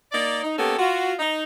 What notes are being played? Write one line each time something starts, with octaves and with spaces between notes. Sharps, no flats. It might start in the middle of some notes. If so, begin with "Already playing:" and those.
A#3 D#4 D5
D#4
A#3 B3 C#4 G4 A4
F4 F#4
D#4